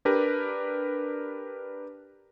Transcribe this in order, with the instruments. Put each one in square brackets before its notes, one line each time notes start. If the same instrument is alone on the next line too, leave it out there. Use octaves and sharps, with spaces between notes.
[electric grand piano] D4 G4 A#4 B4